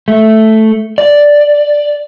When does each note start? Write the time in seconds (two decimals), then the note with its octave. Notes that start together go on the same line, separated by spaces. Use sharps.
0.08 A3
0.98 D5